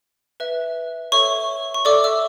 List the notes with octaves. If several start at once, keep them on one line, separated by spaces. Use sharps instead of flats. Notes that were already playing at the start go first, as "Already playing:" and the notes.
B4 E5
A4 C#5 E5 C#6
C#6
A4 D5 E5 D6
E5 E6